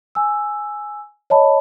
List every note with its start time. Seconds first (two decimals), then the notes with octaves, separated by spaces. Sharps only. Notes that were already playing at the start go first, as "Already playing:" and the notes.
0.15 G#5 E6
1.30 C#5 D#5 A5 B5